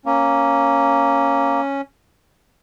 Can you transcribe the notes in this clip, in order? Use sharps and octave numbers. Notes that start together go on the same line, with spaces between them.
A#3 C#4